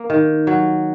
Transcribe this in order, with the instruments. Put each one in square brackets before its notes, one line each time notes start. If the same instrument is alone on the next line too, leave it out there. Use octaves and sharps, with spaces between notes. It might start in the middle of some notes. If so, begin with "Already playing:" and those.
Already playing: [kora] A#3
D#3
F#3